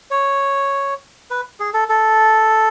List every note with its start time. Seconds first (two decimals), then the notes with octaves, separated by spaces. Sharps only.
0.11 C#5
1.30 B4
1.60 G#4
1.74 A4
1.89 A4